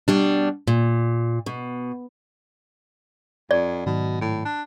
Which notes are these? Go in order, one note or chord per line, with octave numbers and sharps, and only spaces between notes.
B2 G3 D4
A#2
B2
F2 D5
G#2 B2 D#3 F#3
A2
D4